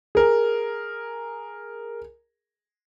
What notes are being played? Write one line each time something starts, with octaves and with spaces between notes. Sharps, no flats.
G#4 A#4